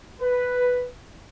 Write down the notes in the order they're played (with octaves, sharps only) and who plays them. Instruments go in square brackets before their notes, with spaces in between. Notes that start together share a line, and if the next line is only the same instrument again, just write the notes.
[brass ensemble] B4